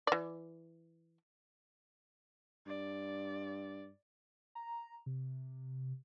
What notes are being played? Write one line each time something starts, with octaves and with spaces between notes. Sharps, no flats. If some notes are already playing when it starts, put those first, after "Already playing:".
E3 D5
G2 D5
A#5
C3